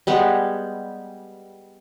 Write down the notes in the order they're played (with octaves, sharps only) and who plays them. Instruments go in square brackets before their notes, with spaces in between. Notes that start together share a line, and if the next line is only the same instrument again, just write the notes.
[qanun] G3 G#3 B3